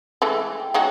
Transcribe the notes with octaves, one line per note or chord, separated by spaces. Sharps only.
E3 G#3 A3
G5
G#3 B3 C#4 D#4 F#4